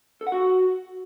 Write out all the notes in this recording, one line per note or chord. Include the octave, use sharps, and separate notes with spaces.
A4
F#5
F#4